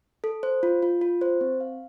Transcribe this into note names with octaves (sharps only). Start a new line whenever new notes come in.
A4
C5
F4
F4
F4
C5
C4
F5